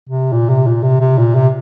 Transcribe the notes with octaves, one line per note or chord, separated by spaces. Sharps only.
C3
A#2
C3
A#2
C3
C3
A#2
C3